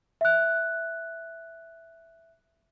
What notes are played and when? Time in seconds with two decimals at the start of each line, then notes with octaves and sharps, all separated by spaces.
0.21 E5 F#6